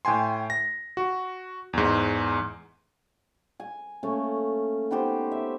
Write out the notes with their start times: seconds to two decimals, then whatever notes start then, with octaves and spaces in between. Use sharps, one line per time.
0.05 A2 G5 G#5 C6
0.50 A#6
0.97 F#4
1.73 E2 G#2
3.60 G#5
4.03 A3 A#3 C#4
4.91 B3 D#4 G4 C5
5.31 E5